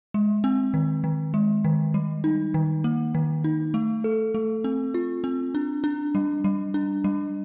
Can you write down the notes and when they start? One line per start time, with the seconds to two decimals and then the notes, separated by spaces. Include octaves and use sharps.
0.14 G#3
0.44 C4
0.74 D#3
1.04 D#3
1.34 G#3
1.64 D#3
1.94 G3
2.24 D#4
2.54 D#3
2.84 A#3
3.15 D#3
3.44 D#4
3.74 A3
4.04 A4
4.34 A3
4.64 C4
4.94 F4
5.24 C4
5.55 D4
5.84 D4
6.15 G3
6.44 G3
6.74 D4
7.04 G3